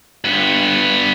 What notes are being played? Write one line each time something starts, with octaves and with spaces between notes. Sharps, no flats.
G2 B3